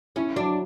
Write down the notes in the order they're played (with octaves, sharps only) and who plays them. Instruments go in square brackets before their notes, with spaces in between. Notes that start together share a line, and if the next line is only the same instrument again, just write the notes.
[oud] C#4 [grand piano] E4
[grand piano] F#3 [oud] D4